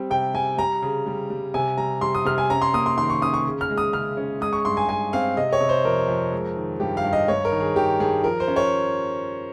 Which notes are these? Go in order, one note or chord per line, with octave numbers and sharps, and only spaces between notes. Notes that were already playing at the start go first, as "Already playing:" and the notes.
Already playing: G3 C4
C3 G5
G3 G#5
G3 A#5
C#3
G3
G3
C3 G#5
G3 A#5
G3 C6
D#6
C3 F6
G#5
C#4 A#5
C6
A#3 D#6
C6
D#3 C6
C#6
C#4 D#6
C#6
C#3
F6
G#3
D#6
C#3 F6
C#4
G#3 D#6
C#6
G2 C6
G#5
G#3 G#5
C4 F5
C3 D#5
C#5
C3
C5
F2 A#4
F2
G#3
D#3
G2 G4
F5
G2
D#5
G2 C#5
A#4
D#3
G#4
D#3 G4
G2 G#4
F3 A#4
C5
C#4
C#5